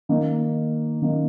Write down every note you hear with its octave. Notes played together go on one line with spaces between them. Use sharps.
D#3 A#3 D#4
D#3 A#3 D#4